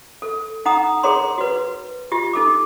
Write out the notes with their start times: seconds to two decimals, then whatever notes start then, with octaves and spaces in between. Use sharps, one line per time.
0.22 A4
0.65 D#4 F#5 A#5 D#6
1.03 G#4 A#4 C#5 A#5 C6
1.38 F#4 B4
2.12 F4 G4
2.33 D#4 A4 D6